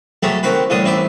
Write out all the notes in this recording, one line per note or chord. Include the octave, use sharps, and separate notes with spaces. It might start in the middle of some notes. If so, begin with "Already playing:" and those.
F#3 G#3 A3 B3 G4
D#3 C4 F#4 B4
A1 A2 D3 G3 D#6
A1 C4 E4 D6